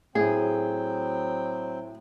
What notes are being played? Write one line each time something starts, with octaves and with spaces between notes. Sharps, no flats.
A2 F#3 C4 G#4 G5